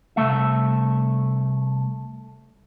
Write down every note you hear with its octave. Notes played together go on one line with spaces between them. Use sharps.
C2 C3 A3 E5